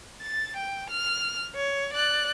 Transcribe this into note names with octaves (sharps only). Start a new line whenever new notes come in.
A6
G5
F6
C#5
D5 F#6